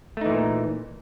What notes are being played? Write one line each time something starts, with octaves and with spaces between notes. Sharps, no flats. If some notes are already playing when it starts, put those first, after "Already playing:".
A#2 E3 A3 D#4